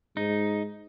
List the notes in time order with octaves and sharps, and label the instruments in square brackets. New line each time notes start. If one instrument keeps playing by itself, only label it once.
[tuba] G#2 [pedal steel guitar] D#4